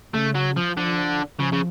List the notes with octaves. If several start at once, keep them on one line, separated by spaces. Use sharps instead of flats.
C#3 A3
F#3
F3
D3 F3
C#3 F3
C#3